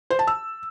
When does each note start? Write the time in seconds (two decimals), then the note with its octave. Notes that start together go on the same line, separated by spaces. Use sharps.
0.10 C5
0.19 A5
0.27 E6